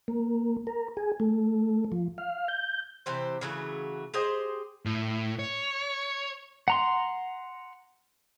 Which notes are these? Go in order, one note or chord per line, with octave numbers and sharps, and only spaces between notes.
A#3
A#4
G#4
A3
F3
F5
G6
C3 E3 G4 C5
C#3 E3 F#3 A3
G4 G#4 C5 D#5
A2
C#5
F#5 A#5 C6